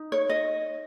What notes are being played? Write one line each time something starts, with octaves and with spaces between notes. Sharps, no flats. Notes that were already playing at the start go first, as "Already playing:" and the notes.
Already playing: D#4
C#5
D#5